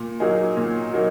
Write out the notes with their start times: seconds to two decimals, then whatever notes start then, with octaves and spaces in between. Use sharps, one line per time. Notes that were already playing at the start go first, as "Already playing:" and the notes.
Already playing: A#2
0.20 F#3 A#3 D#4 G#4
0.57 A#2
0.94 F#3 A#3 D#4